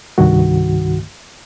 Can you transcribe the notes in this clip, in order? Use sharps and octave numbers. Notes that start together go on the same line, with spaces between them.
C2 G2 D#3 F#4